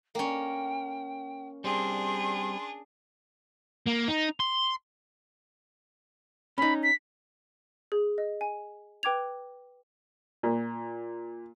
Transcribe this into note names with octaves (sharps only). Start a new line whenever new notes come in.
A#3 C#4 G5
G3 C4 D4 G#4 C6
A#3
D#4
C6
C#4 D#4 B5
B6
G#4
D#5
G#5
B4 G5 D6 G#6 F7
A#2